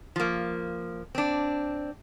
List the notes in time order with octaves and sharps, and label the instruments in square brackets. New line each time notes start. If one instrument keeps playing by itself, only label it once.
[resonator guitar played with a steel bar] F3 A#3
C4 D4